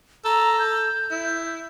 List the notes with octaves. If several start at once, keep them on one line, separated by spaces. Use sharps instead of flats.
A4 A#5
G6
E4